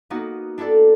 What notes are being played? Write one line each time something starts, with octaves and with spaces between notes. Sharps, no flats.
A#3 B3 D#4 F#4
D4 E4 G4 A4 D5